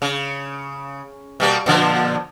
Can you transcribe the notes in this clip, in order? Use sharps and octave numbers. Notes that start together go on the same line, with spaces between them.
C#3
B2 G3 A#3
A#2 D3 F3